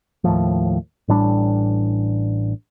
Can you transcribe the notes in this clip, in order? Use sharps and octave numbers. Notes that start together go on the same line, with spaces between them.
D#2 A2 F3
A1 A2 G3 D4